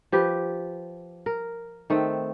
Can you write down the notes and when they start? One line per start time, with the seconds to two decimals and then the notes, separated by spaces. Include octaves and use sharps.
0.12 F3 G4 B4
1.26 A#4
1.90 D#3 A3 C4